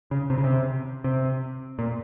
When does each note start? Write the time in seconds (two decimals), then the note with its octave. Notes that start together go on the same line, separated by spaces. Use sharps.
0.11 C#3
0.30 C3
0.38 C#3
0.44 C3
1.04 C3
1.79 A#2